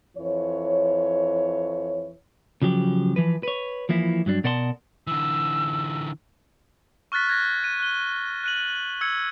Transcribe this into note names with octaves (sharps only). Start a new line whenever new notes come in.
F2 E3 C#5
C#3 F3 F#3 G4
E3 F3 B4
B4 C#5
E3 F3 A#3 E4
G2 F#3 D4
B2 A#4 D5 F#5 A5 C6
D3 E3 E6
C#6 F6 F#6 A6 B6
F#6 G#6 A#6
F#6 D#7
F#6 G7
F#6 D#7 F#7
E6 G#6 C#7